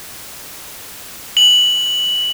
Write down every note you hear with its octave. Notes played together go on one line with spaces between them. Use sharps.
F#7